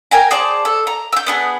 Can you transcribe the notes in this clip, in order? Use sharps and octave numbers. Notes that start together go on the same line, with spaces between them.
A#4 G5 G#5 A#5
G#4 C5 D5 A5
A4
A#5
E6 G6
B3 D4 G#4